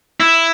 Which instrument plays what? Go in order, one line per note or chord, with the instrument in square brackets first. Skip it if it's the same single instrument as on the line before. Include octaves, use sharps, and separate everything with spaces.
[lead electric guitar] E4